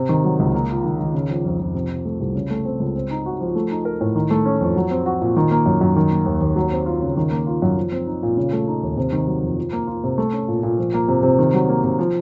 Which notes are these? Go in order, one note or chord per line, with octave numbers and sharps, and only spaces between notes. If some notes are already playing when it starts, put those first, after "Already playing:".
Already playing: C3
D#3
F#3
C#2
A#3
F4
D#3
D#3
C#3
F3
F2
F2
C3
F3
A3
C2
C#3
A3
C4
C#2
C4
D#4
F#4
F3
A3
D#4
A#4
A2
D#3
A3
C#4
F2
F#3
C4
F#4
A#2
D#3
A#3
F#2
F#2
D#3
A#3
D#2
D#2
F#3
C4
F4
C#3
D#3
A#3
F4
F#2
F3
C4
D#4
A#2
C#3
A3
D#4
D#2
C3
D#3
F#3
F2
F3
A#3
F4
C3
A3
C#4
A#2
A#2
F3
A#3
C3
C3
D#3
F#3
A#3
C3
F3